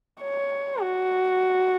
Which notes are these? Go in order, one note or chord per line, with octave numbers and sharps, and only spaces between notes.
C#5
F#4